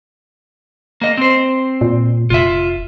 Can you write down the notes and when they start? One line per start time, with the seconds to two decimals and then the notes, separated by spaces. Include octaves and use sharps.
1.01 A#3 D#5
1.18 C4 C5
1.81 A#2
2.30 F1 F4 E5